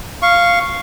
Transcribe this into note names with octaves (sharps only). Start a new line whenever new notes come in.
F5 C#6